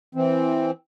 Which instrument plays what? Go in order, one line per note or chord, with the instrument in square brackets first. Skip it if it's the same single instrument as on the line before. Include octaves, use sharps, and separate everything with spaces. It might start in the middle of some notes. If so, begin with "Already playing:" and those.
[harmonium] E3 C4